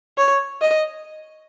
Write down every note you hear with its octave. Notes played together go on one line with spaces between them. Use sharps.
C#5
D#5